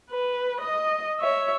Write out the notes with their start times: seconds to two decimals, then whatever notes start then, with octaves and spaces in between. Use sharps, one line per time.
0.10 B4
0.60 D#5
1.20 C#5 E5